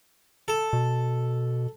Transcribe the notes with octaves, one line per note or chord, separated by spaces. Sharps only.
A4
B2